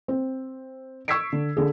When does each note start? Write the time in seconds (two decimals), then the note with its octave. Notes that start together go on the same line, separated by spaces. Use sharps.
0.08 C4
1.08 C#6 E6 G#6 B6 C7 D7
1.33 D3
1.57 D3 G#4